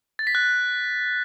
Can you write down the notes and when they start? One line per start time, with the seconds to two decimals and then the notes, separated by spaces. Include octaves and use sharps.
0.19 A6
0.27 B6
0.35 F#6